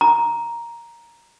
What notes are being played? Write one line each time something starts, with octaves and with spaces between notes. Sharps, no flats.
A#5